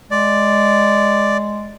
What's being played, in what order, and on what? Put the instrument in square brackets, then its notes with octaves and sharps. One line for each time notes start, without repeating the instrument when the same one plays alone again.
[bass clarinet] G#3 [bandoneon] D5